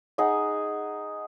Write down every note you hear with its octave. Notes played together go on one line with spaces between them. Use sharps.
D#4 G#4 F#5 G#5